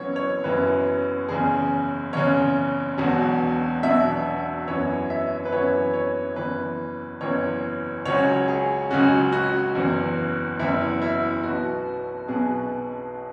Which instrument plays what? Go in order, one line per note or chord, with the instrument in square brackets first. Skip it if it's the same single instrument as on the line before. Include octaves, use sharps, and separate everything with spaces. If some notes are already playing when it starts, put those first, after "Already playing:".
Already playing: [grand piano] F#1 F#2 E3 B3 C#5
C#5
F#1 F#2 E3 B3 B4
F#1 E2 C#3 G#4
F#1 E2 C#3 C#5
E1 E2 B2 F#3
E1 E2 B2 F#3 E5
F#2 E3 B3 C#5
E5
B4
F#2 E3 B3 C#5
C#5
F#1 E2 E3 B4
F#1 E2 E3 C#5
C#2 C#3 F#3 C#4 C#5
G#4
C#2 C#3 F#3 C#4 F#4
F#4
F#1 E2 E3
F#1 E2 E3 E4
E4
B1 B2 B3 F#4
B1 B2 B3 G#4